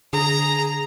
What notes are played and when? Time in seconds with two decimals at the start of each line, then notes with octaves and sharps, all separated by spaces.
0.13 D3 G#4 A#5